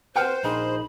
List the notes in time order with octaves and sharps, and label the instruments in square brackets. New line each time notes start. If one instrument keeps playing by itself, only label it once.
[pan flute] B4 [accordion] C5 [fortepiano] F#5 G5 F6
[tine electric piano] A#1 D#4 G#4 [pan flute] B5